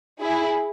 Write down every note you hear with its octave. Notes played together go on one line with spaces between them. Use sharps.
E4 G#4